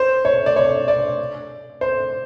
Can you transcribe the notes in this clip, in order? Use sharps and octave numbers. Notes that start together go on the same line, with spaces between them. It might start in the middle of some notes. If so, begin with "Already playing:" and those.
Already playing: C5
C#5
D5
C#5
D5
C5